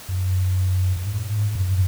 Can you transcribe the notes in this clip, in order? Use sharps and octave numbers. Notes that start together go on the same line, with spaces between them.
F#2
F#2
G#2
A2
G#2
F#2